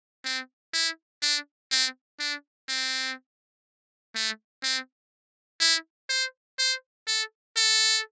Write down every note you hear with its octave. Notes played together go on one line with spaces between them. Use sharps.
C4
E4
D4
C4
D4
C4
A3
C4
E4
C5
C5
A4
A4